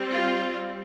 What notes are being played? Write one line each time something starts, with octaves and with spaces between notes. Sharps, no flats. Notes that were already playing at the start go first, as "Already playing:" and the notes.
Already playing: G3 C4
F4